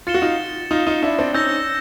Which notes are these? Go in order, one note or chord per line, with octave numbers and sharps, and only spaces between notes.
F4 A6 C#7 E7 G7
F#4
D#4 F4
D#4 F4
D#4 F4
D4 E4
C4 D4
C#4 D#4 E6 G6 A#6